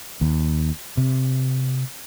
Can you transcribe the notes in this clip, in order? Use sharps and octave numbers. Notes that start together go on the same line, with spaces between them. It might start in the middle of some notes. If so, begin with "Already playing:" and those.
D#2
C3